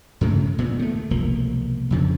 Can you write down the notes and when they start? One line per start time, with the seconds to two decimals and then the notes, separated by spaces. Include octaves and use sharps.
0.21 G2 C#3 G#3 A3
0.59 A#2 B3
0.79 D#3 A3
1.11 E1 C2 F3 A#3
1.91 F2 C#3 F3